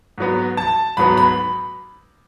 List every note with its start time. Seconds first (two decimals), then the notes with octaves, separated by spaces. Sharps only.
0.18 G#2 F#3 B3
0.57 A5
0.97 G#2 F#3 B3 B5
1.17 B5